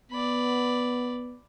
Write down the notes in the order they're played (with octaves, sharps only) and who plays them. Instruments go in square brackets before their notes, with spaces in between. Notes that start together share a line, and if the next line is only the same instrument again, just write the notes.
[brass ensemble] B3 [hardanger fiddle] D5 B5